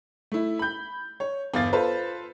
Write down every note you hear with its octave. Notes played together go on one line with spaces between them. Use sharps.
A3 E4
B5 G6
C#5
G1 E2 F5 A6
F4 A4 B4 C5